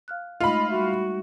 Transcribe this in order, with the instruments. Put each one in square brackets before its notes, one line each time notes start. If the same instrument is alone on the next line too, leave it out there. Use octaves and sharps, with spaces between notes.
[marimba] F5 F6 F#6
[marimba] G#3 A3 D#4 [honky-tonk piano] F4 B5 [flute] D#5
[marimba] G3 E5 [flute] F#4